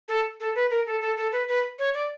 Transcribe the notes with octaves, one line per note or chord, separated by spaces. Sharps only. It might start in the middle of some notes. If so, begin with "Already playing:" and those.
A4
A4
B4
A#4
A4
A4
A4
B4
B4
C#5
D5